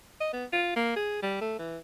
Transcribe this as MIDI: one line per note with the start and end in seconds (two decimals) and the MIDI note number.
0.20 0.32 75
0.33 0.45 59
0.53 0.75 65
0.76 0.93 58
0.96 1.20 68
1.22 1.36 55
1.41 1.58 57
1.59 1.77 52